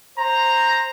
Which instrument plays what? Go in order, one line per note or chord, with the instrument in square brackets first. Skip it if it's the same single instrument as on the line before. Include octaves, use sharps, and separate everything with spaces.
[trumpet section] C5 A#5